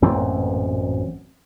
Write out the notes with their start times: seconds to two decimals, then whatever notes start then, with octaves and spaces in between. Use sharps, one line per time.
0.02 A1 F#2 A#2 C4